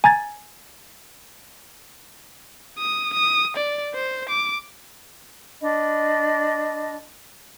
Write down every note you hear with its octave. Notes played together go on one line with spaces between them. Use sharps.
G#5 A#5 G#6 A6
D#6
D#6
D5
C5
D6
D4 D#5 B5